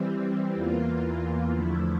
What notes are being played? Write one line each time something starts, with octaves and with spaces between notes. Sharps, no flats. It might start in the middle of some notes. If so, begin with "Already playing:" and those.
Already playing: E3 G3 C4
E2 E3 A#3 F4
E2 D3 F3 A3 E4